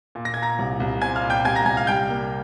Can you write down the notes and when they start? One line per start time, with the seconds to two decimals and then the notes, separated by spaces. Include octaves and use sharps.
0.15 A#2
0.25 A#6
0.34 A#2 G#6
0.42 A#5 A#6
0.59 C2
0.80 C2
1.01 C4 G#5 G#6
1.16 F5 F6
1.23 A#2
1.30 G5 G6
1.45 C2 G#5 G#6
1.55 A#5 A#6
1.66 C2 G#5 G#6
1.77 F5 F6
1.87 G3 G5 G6
2.10 A#3